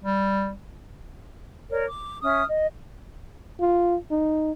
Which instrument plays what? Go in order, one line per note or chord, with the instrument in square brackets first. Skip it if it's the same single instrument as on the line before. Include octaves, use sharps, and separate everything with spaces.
[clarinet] G3
[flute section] A#4 C#5 D5
D6
C#4 E5 D#6 F6
D#5
[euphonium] F4
D#4